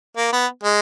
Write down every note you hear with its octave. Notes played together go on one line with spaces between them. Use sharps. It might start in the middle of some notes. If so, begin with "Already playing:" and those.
A#3
B3
G#3